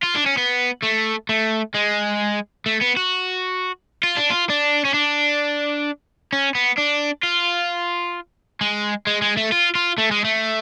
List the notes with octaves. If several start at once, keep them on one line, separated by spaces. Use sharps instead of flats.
F4
D4
C#4
B3
A3
A3
G#3
A3
B3
F#4
F4
D4
F4
D4
C#4
D4
C#4
B3
D4
F4
G#3
G#3
G#3
A3
F4
F4
A3
G#3
A3